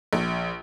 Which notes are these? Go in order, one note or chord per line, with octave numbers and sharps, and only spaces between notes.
A#1